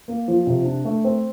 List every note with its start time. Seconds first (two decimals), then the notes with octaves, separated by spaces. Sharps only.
0.08 A#3
0.28 F3
0.47 C3
0.66 D4
0.85 A3
1.04 C4